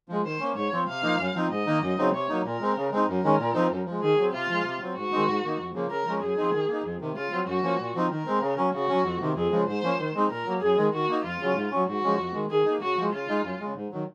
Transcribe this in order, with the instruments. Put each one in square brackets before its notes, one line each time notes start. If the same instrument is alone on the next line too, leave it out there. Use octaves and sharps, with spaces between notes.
[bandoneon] F3 G#3
[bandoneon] D#3 [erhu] C5
[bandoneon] A#3 C#4
[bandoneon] G#2 [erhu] C#5
[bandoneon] F3 C4
[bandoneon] C3 [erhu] F5
[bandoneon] F3 A#3 D#4
F#2
F3 C4 D#4
[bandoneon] G#2 [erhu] D#5
[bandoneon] D#3 A#3 D#4
F#2
C#3 F#3 C4 D#4
[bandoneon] C3 [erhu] C#5
[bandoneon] F#3 A#3 D#4
[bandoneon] A#2 [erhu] A#4
[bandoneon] G#3 C4
C#3
G#3 C4 D#4
[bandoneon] F#2 [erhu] A#4
[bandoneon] D#3 G#3 C#4
A#2
F3 C4 D#4
F#2
F3 G#3
[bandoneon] D#3 [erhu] G#4
[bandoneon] F#3 C4
[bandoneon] C3 [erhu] F4
[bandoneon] F3 G#3
C3
F#3 C4
[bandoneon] G#2 [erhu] F#4
[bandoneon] D#3 G#3 C4 D#4
G#2
D#3 A#3 D#4
F2
C#3 F3 A#3
[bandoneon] C#3 [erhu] A#4
[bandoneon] F3 G#3 C#4
[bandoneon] F#2 [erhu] G#4
[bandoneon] F3 C4 D#4
D#3
A#3 D#4
F2
C3 D#3
[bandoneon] C#3 [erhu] F4
[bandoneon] F#3 C4
[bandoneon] F#2 [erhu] F#4
[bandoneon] F3 A#3 C#4
A#2
F3 C4 D#4
[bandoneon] D#3 [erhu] A#4
[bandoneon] G#3 C4
C#3
F#3 C#4
[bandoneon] C#3 [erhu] F#4
[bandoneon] F#3 C#4
F2
C3 D#3
[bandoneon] F2 [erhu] G#4
[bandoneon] C#3 F3 G#3
[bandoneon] G#2 [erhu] C5
[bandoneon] F3 A#3 C#4
D#3
G#3 C4 D#4
[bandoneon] A#2 [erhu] A#4
[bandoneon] F#3 A#3
[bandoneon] F#2 [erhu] G#4
[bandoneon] D#3 G#3
[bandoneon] D#3 [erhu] F#4
[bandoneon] A#3 D#4
[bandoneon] F2 [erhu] F4
[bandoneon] C#3 F#3 C#4
G#2
F#3 C#4
[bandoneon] G#2 [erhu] F#4
[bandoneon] F3 G#3 C#4
F2
D#3 G#3
[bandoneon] D#3 [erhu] G#4
[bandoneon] A#3 D#4
[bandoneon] C#3 [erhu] F#4
[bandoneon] F3 G#3
[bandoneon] C#3 [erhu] F4
[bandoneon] G#3 D#4
F#2
C#3 G#3
G#2
D#3 F#3